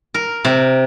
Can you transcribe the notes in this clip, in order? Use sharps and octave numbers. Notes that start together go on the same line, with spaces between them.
A#4
C3